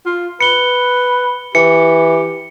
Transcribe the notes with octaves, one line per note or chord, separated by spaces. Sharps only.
F4
B4 C#7 G7
E3 G4 C#7